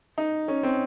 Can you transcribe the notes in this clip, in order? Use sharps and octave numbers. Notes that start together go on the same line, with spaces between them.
D#4
C#4
C4